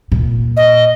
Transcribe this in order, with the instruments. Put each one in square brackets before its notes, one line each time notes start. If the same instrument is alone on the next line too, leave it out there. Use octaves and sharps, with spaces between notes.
[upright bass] A#2
[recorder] D#5